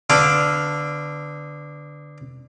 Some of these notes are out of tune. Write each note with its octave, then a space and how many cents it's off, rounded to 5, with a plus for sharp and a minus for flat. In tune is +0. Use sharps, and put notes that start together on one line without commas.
D3 +0 B3 +20 F5 +0